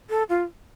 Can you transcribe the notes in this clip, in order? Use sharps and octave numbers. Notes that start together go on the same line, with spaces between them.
A4
F4